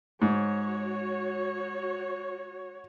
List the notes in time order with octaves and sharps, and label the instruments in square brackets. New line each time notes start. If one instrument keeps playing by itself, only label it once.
[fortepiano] G#2 [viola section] F#4 C#5